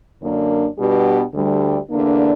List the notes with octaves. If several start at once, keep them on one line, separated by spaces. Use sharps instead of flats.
F#2 D3 A#3 D4
B2 G3 B3 D4 G4
D2 D3 G3
E2 D3 A#3 D4